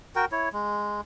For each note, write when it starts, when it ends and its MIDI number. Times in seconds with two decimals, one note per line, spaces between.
0.16 0.25 66
0.16 0.25 70
0.16 0.25 79
0.32 0.49 64
0.32 0.49 73
0.53 1.01 56